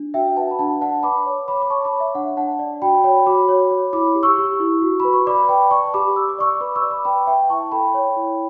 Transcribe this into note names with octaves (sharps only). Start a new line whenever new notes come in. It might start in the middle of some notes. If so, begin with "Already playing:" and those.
Already playing: D4
F#4 E5 G5
B4 F#5 A5
B5
D4 F#5 A5
D5 F#5 A5
B4 B5 D6
C#5
C#5 B5 D6
D6
C#5 A5 C#6
B5 D6
C#5
E5
D4 F#5
D4 F#5 A5
D5
F#4 G5 B5
C#5 G5 B5
F#4 B5 D6
C#5
C#5
E4 B5 D6
G4
C#6 E6
G4
E4
F#4
B4 B5
C#6
D5 B5 D6
B4 G5 B5
D5 A5 C#6
G4 B5 D6
D5 E6
D6
D5 C#6 E6
B4 B5 D6
C#6 E6
D5
B5 D6
B4 G5 B5
B4 E5 G5
E4 A5 C#6
A4 G5 B5
C#5
E4